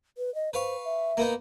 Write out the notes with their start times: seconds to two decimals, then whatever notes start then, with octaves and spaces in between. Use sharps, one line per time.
0.18 B4
0.35 D#5
0.53 B4 C5 F5 C#6
0.85 E5
1.17 A#3 B3 D#4